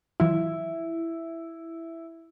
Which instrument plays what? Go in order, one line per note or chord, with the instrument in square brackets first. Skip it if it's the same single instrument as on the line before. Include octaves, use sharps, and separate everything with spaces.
[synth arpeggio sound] E3 F#3 F4 [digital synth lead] E4